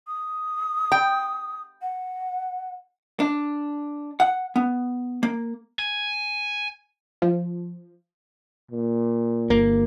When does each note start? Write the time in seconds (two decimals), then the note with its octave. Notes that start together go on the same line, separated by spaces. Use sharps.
0.07 D#6
0.92 G5
1.82 F#5
3.20 D4
4.20 F#5
4.56 B3
5.23 A#3
5.79 G#5
7.22 F3
8.71 A#2
9.50 G1 A#3